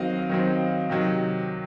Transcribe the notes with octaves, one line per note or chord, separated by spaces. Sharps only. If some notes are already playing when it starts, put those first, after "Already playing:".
Already playing: D#3 F#3 C4 D#5 F5
D#3 F#3 C4
C3 D#3 F#3